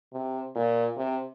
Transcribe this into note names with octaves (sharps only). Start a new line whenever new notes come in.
C3
A#2
C3